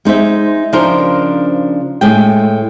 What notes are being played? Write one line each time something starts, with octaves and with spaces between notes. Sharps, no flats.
G#3 D#4 C5 E5
C#3 F3 D4 D#4 A#4 C5
A2 G#3 G5